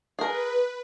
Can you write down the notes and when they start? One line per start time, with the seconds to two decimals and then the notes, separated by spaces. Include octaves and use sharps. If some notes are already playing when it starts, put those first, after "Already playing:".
0.19 G#4 A#4 B4